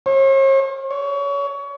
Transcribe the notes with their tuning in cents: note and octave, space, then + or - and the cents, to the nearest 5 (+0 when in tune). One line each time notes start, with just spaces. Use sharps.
C#5 -45
C#5 +25